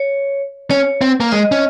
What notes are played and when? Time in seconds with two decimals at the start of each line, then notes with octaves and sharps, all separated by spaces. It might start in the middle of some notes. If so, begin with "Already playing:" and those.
Already playing: C#5
0.71 C#4 C#5
1.01 C4
1.20 A#3
1.32 G#3 D#5
1.52 C#4